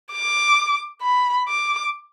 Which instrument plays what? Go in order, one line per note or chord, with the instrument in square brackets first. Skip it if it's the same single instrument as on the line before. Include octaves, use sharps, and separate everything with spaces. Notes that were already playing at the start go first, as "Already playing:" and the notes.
[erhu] D6
B5
D6